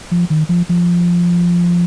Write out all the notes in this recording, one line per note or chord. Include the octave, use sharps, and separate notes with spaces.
F3
D#3
F3
F3